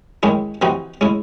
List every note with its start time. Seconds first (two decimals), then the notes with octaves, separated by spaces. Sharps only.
0.23 D#3 G#3 C#4 E4
0.62 C3 E3 C4 D#4 F#4
1.01 G#3 C#4 E4